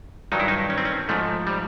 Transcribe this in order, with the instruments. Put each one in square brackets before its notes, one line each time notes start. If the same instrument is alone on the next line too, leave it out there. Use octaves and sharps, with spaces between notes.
[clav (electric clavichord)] G2 D#3 F#3 D#4
E4
D#4
C#4
C4
C#4
G#2 F3 A3
G3